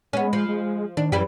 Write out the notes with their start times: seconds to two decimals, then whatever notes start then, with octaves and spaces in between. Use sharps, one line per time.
0.13 G#3 B3 C#4
0.33 F3
0.49 G#3
0.97 D#3 D4
1.12 F#2 E3 G3 G4